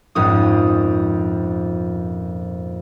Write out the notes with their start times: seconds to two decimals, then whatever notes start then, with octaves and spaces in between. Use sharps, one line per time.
0.15 A#1 F2 G#2 C#4 D#6